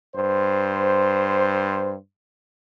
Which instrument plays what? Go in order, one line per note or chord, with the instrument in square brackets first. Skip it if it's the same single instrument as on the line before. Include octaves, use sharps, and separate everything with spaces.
[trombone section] G2 C5